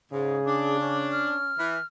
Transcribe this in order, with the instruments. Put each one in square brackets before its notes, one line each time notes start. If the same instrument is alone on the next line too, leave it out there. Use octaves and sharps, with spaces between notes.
[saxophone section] G#2 [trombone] C#3 [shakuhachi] G#4
[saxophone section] D4 [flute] D6
[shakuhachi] C#4
[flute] F6
[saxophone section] E3